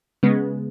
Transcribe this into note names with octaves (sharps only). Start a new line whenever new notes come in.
C#3 G#3 B3